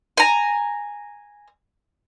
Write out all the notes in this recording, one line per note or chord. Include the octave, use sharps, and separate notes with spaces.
G#5 A#5